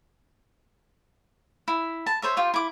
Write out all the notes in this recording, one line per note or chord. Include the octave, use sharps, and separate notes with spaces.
E4
A5
C5 C#5 E5
F4 G4
E4 D6